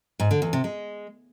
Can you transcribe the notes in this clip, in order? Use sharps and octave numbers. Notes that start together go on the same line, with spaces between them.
G#2
D3
E2
C3
G#3